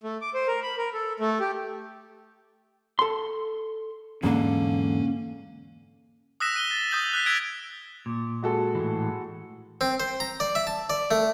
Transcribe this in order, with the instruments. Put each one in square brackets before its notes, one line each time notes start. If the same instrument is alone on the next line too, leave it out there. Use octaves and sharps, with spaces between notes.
[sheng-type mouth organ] A3
D6
C5
A#4
B5
A#4
A4
A3
G4
[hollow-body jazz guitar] A4 C6
[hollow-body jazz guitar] E2 G#2 D3 [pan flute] A#3 [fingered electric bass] C#4
[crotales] D#6 E6 F#6 A#6 B6 E7
D#6 D#7 G7
A6
D#6 G6 F#7
F#6 G6 B6
E6 G#6 B6 D7
[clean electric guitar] A#2
[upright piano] G#3 F#4 A4
[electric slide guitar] A2 E3
[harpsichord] C4
C5
A#5
D5
E5
A5
D5
A3